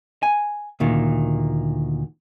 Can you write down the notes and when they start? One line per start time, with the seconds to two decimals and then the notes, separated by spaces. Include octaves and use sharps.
0.23 G#5
0.80 D2 A#2 D#3